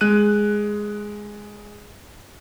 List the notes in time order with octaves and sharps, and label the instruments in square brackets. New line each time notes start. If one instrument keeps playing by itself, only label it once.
[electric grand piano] G#3 F#6 D#7